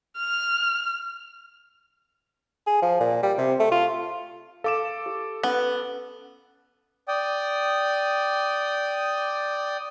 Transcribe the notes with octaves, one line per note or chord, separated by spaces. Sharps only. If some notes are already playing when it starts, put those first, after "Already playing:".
F6
G#4
F3
A#2
G3
C3
A3
F4
A4 F5 D6 E7
G4
B3 C#4 B4
D5 G5 D#6